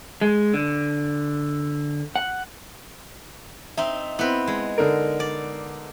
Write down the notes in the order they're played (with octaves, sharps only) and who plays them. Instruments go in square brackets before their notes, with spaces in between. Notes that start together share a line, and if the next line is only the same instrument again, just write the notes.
[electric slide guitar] G#3
D3
F#5
[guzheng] C4 D#4 [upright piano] E5
[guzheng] B3 B4 [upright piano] C4 E4
[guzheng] G#3
[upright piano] D3 D#4 A#4
[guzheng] D5